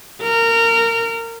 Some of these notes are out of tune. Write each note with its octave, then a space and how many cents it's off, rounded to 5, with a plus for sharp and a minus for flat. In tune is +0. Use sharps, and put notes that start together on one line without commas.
A#4 -20